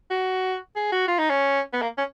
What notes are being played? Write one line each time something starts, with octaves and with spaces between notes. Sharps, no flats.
F#4
G#4
F#4
F4
D#4
C#4
B3
A#3
C#4